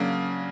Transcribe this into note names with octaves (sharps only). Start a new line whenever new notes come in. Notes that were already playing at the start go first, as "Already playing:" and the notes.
Already playing: C#3 F#3 A#3 D4